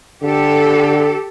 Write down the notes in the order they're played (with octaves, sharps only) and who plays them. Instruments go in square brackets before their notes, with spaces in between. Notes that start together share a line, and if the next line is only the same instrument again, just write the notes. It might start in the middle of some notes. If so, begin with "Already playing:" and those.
[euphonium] D3 [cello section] G4 A4